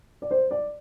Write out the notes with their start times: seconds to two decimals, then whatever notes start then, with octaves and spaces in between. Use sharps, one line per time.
0.22 D5
0.31 C5
0.51 D5